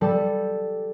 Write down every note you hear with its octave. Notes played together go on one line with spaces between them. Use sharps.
G3 A4